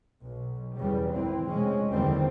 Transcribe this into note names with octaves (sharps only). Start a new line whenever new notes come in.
B1
E2 C#3 G3
G#1 E3 C4
F1 G#3 C4 C#4
F#1 E2 D3 D#3 G3 C4